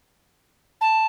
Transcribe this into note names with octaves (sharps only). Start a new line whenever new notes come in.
A5